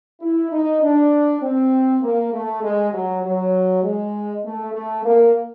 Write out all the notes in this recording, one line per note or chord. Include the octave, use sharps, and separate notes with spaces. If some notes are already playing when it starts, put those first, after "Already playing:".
E4
D#4
D4
C4
A#3
A3
G#3
F#3
F#3
G#3
A3
A3
A#3